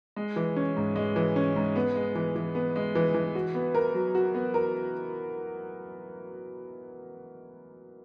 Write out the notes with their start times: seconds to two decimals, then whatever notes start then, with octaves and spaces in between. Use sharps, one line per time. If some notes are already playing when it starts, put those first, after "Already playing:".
0.16 G#3
0.36 E3
0.56 C#4
0.76 G#2
0.96 G#3
1.16 E3
1.36 C#4
1.56 G#2
1.76 B3
1.95 G#3
2.15 E3
2.36 E3
2.55 B3
2.76 G#3
2.95 E3
3.14 E3
3.35 F#4
3.55 B3
3.75 A#4
3.94 F#3
4.15 F#4
4.35 B3
4.54 A#4